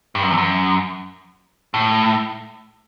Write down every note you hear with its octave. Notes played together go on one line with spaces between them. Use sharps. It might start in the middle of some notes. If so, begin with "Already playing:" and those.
G2
F#2
E2
F#2
A2